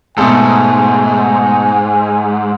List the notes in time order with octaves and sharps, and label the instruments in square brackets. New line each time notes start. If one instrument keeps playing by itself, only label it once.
[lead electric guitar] G#2 [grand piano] B2 A3 A4 [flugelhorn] G#5